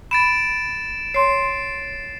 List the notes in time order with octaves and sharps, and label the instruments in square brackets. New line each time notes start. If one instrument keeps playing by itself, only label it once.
[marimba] B5 [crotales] A6 D7 E7
[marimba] C#5 C6 [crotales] C7